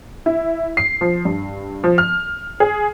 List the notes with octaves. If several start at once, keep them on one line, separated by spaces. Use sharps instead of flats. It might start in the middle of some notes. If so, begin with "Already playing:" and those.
E4
C7
F3
G2
F3
F6
G#4